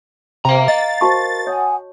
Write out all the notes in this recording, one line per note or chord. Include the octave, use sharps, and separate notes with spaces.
C3 F5 A#5
D#5 A6
F#4 A#4 C5 A5 C#6
C#5 F#5 G#5 D#6